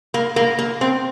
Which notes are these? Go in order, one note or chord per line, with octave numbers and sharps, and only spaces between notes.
A#3
A#3
A#3
C4